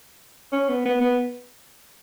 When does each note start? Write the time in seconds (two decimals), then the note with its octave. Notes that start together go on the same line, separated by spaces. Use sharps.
0.52 C#4
0.69 B3
0.85 B3
1.01 B3